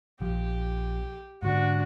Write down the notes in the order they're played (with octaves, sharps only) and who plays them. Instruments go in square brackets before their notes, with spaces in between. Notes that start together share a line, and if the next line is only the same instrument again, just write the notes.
[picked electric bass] A#1 F3 [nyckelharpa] G4
[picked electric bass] G#2 D3 [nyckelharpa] D4 F#4